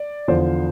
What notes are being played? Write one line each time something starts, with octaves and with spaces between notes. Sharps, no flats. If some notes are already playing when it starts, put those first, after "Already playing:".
Already playing: D5
E2 D3 F3 C5